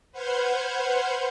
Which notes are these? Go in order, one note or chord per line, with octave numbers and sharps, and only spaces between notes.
B4 C5 F#5 F6 G6 G#6